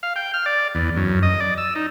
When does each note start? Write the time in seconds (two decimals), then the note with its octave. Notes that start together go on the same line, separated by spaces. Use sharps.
0.03 F5
0.16 G5
0.34 F6
0.46 D5
0.75 E2
0.96 F#2
1.23 D#5
1.40 D5
1.58 E6
1.75 D#4